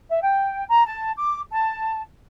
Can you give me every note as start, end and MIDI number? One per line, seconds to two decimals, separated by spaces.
0.09 0.21 76
0.22 0.64 79
0.69 0.84 82
0.86 1.11 81
1.16 1.41 86
1.50 2.01 81